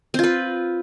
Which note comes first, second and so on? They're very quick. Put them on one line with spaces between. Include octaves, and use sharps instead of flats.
C4 F4 B4